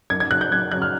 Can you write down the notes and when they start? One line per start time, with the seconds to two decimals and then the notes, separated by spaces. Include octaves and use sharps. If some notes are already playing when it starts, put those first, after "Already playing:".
0.10 F#2 G#6
0.20 G#6
0.31 C#3 F#3 F#6
0.41 G6
0.51 F#2 G#6
0.72 C#3 F#3 F#6
0.82 F6